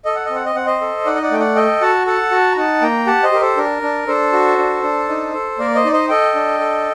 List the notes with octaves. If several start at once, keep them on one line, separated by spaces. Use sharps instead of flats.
A4 D#5
F#5
C4 D#5
F#5
D#5
C4 F#5
C5 D#5
A4
D#4 D5 F#5
D#5
D5 F#5
A3 G5
D5 F#5
A4 D#5 G5
F#4 F#5 A5
A4 F#5 A5
F#4
A#5
D#4 F#5 A5
A#3 G5 A#5
G4 F#5 A5
C5 D#5
G4 A#4
A4 C5
D4 A#4
D4
D4 A4 C5
F#4
D4
D4
D#4
A4
A#3 A#4 D5
C5 D#5
D#4 D5
C5 D#5
A4 D#5 G5
D4
A4